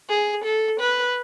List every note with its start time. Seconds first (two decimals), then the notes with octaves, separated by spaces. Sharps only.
0.09 G#4
0.44 A4
0.80 B4